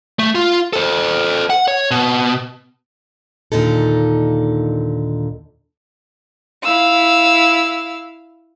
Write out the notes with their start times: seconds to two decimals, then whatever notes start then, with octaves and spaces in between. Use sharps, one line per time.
0.19 A3
0.35 F4
0.73 A4 C5
1.50 F#5
1.68 C#5
1.91 B2
3.52 D#2 A#2 D3 D#4 A4
6.63 E4 F5 E6